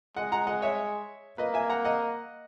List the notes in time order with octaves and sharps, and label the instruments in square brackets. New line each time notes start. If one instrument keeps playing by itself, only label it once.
[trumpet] G#3 [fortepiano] D#5 F#5
[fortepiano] F#5 A#5
D#5 F#5
C#5 E5
[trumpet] A#3 [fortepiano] B4 D#5
[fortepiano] E5 G#5
F#5 A#5
D#5 F#5